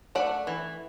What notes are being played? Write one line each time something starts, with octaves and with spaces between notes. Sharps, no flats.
A3 D5 F#5
E3